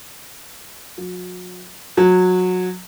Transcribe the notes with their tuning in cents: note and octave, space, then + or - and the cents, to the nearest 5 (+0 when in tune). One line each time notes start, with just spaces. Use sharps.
F#3 -40
F#3 -20